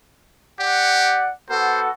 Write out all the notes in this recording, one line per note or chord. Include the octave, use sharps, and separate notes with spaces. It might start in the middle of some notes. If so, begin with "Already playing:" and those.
G4 D5 F#5
B3 F#4 A4 C5